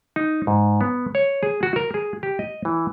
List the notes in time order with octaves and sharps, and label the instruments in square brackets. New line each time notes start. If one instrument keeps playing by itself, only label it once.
[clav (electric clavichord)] D#4
G#2
B3
C#5
G#4
F#4
A#4
G#4
G4
D#5
E3